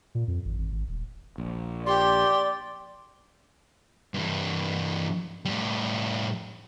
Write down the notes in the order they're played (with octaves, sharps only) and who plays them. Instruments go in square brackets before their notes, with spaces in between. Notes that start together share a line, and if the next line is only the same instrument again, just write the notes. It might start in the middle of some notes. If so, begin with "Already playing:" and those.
[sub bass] A#2
F2
G#1
G#1
G#1
D#1
[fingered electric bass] A#1
[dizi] G4 [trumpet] D5 [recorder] C6
[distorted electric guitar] G2 E3
A2 G3